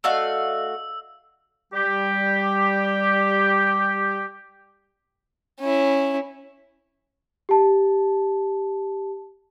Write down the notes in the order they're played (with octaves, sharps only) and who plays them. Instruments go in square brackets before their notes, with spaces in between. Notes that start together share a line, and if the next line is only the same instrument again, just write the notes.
[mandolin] A3 F#4 F5 [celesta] D5 D#5 [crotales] E6
[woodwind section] G3 G4
[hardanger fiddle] C#4 E4
[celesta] G4 A5